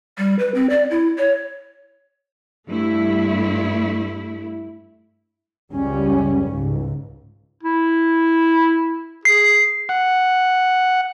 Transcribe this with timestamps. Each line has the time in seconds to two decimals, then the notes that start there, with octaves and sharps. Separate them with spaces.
0.18 G3
0.39 B4
0.55 C4
0.70 D5
0.90 E4
1.18 C#5
2.67 G2 A3 E4
5.73 C#2 F#2 G3 C#4
6.44 C#2 G#2
7.63 E4
9.25 G#4 C7
9.89 F#5